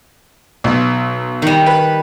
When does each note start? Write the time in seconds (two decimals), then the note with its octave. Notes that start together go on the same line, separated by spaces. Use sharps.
0.64 B1
1.42 D#3 G3
1.66 B4